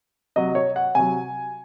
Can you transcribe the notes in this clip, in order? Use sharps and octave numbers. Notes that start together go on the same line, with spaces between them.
C3 F#3 D#5
C#5
F#5
C3 F#3 G#5